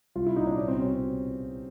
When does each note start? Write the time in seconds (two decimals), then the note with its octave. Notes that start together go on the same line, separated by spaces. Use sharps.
0.15 C2 F4
0.26 E4
0.36 A#2 D#4
0.47 D4
0.57 C2 C#4
0.68 C4
0.78 B2 C#4